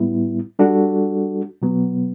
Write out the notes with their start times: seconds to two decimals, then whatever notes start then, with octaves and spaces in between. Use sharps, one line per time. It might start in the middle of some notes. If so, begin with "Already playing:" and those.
Already playing: A2 G3 B3 E4
0.59 G3 D4 F#4 A4
1.62 B2 F#3 B3